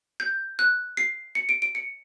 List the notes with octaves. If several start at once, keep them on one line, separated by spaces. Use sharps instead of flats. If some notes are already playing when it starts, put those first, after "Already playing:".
G6
F#6
C7
C#7
D7
D7
C#7